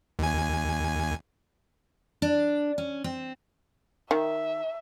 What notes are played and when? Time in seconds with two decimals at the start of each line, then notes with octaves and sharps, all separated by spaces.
0.19 D#2 G#5
2.22 D4
2.78 C#4
3.04 C4
4.11 D#3 E5